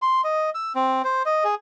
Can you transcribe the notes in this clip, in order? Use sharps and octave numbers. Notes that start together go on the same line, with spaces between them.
C6
D#5
E6
C4
C5
D#5
G#4